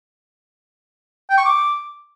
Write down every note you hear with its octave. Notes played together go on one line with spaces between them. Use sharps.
G5
C#6
D6